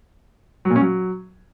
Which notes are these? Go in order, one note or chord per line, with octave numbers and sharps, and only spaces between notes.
F#3
A#2
C#4
F#3